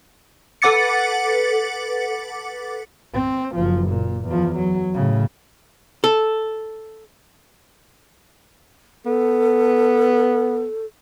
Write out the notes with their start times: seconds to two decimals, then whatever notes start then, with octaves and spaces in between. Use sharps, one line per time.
0.62 A4 B4 F#5 D6 A6 C#7
3.14 C4
3.55 F#1 F3
3.89 A#2
4.26 E2 F3
4.56 F#3
4.94 A2 C#3
6.04 A4
9.06 B3 A4